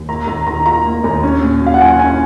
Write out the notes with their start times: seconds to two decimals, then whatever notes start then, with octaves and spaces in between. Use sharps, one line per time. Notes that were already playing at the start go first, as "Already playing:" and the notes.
Already playing: D#2
0.09 A#3 A#5
0.27 D#2 A#5
0.47 D#3 A#5
0.66 F4 A#5
0.85 A#3
1.04 D#2
1.23 C#4
1.42 A#2
1.61 F#3
1.66 F5
1.74 F#5
1.80 F4 G#5
1.99 C#4 G#5